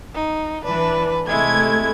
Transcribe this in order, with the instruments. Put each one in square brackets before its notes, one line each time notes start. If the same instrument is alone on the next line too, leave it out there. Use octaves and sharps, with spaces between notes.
[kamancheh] D#4
[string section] E3 D4 [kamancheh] B4
[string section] C3 A3 G#6 [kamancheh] G#3 E4